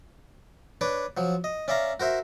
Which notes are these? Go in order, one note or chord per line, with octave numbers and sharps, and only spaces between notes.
D4 B4 C#5 D6
F3 F#3
D#5
C#4 D5 E5 F5 A#5
F#4 A#4 C5 E5